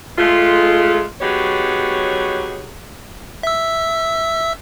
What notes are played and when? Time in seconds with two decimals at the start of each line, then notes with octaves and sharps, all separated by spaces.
0.18 G#3 A3 F4
1.21 F#3 B3 D#4 G4 G#4 C#5
3.43 E5 E6